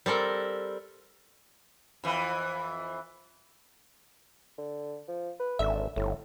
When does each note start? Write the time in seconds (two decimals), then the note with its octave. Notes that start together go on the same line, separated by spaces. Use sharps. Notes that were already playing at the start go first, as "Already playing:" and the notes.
0.06 G3 C4 A4 A#4
2.04 F2 E3
4.58 D3
5.08 F3
5.40 B4
5.59 G#1 D3 E5
5.96 G1 A2